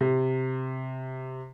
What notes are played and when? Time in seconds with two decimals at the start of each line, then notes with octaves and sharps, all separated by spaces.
0.01 C3